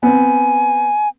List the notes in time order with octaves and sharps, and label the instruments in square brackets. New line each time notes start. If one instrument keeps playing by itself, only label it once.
[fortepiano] B3 C4 [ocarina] G#5